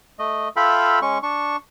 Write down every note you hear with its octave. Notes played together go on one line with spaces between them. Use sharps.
A3 D#5
F4 A4 E5 F5 G5 B5
G#3 C#4 C#6
D4 C#6